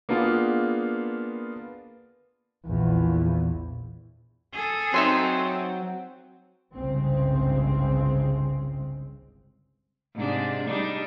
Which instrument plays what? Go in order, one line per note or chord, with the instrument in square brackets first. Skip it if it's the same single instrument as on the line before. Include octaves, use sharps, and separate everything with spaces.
[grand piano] A#3 B3 D4 F4 G#4
[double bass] A#1 E2
[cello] G#4 A4
[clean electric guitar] F#3 [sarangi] C4 [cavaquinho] D#4 E5 C6
[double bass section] G1 C2 G2 C#3 G#3 C4
[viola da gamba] G#2 C3 D4
G3 D4 D#4